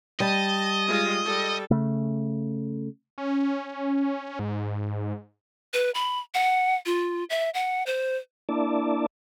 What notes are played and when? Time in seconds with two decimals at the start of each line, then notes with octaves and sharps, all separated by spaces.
0.20 G3 D#5 A5
0.88 G#3 F4
1.25 G3 A4
1.71 C#3 A3
3.18 C#4
4.39 G#2
5.74 B4
5.95 B5
6.35 F#5
6.86 F4
7.30 E5
7.54 F#5
7.86 C5
8.49 A#3 D4 E4 D5 A5